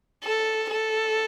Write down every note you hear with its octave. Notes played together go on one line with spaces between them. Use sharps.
A4
A4